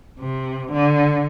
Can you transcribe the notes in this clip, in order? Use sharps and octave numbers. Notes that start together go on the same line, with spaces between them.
C3
D3